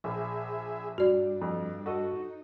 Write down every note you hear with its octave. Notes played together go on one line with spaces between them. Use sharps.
A#1 G#4 E5
G2 F#4 D5
F2
F#4 A4 D#5
D#4